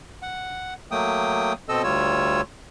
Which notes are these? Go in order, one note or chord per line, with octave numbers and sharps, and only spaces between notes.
F#5
F#3 A3 A#3 G5 D#6
B2 C4 A4 D#5 E6
D2 G3 F4 C#5 E6